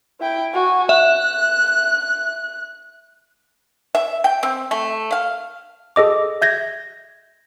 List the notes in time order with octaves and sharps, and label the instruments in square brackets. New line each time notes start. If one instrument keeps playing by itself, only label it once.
[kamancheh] E4 G5
F#4 G#5
[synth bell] E5 [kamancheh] F#6
[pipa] E5
G5
C4
A3
F5
[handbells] G#4 A4 D#5 D6
E5 G6 G#6 A#6